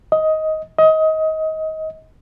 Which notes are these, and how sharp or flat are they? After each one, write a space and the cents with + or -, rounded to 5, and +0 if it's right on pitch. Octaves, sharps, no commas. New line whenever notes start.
D#5 +15
D#5 +25